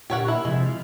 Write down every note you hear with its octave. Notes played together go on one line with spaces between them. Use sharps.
A#2 D3 G4 A#4 C#5 F#5
E4
C3 F3 G#3 E4
F4